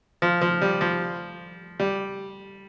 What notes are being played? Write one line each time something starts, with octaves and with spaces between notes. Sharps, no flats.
F3
F3
G3
F3
G3